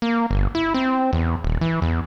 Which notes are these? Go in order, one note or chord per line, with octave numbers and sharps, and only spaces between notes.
A#3
G1
E4
C4
E2
D#1
E3
E2